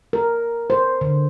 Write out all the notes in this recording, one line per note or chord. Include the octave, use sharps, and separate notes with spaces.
A#4
C5
D3